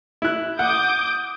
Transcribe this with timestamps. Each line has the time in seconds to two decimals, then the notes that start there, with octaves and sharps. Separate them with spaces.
0.22 E4 F#6
0.59 F#5 D6 D#6 G6